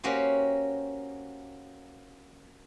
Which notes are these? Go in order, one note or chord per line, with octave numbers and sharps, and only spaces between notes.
A#3 C#4 F#4 G4 C5